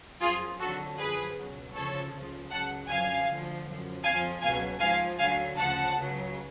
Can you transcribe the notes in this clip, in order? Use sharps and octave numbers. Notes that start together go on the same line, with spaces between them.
F#2 F3 F4 G#4
F2 D3 F#3 F#4 A4
F#2 F3 G#4 B4
C#2 B2 F#3
D2 C#3 F3 A4 C#5
C#2 C#3 F3
C#2 C#3 F#3 F#5 A5
F#2 D3 F3 F5 G#5
D2 D3 F3
F#2 F3
F2 F3 F5 G#5
C#2 B2 F#3 F5 G#5
G#2 F3 F5 G#5
D2 D3 F#3 F5 G#5
D2 C#3 F3 F#5 A5
C#2 C#3 F#3